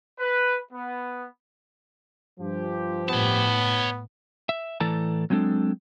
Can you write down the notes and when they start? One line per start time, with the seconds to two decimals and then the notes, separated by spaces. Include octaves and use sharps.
0.19 B4
0.73 B3
2.39 G2 F3 G4
3.09 A2 B3 C#5 A5
4.49 E5
4.80 A2 E3 A4 D5 A5 A#5
5.30 F#3 G#3 C4 D4 A4